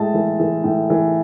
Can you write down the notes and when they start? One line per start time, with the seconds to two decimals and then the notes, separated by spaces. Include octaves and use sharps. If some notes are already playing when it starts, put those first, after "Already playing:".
Already playing: A2 G#3 A5
0.14 E3
0.40 E3
0.64 A2
0.90 E3